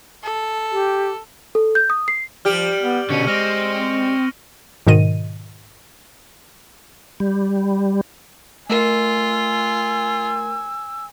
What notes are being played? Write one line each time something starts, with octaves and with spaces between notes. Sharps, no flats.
A4
G4
A4
G6
D#6
C7
F3 G3 G4 F6 D7 F#7
B3
B2 D3 C#4 C#6 C#7 D#7
G#3 C4 F6 A#6 F7
G#2 B2 D#3 D#5 D#7
G3
A3 F4 A#4 G#5 E6